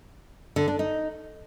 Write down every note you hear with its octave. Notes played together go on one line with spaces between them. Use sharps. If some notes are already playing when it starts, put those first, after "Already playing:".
D3
D4
D#4